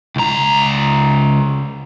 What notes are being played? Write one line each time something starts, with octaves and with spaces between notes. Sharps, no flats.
C#2 A#5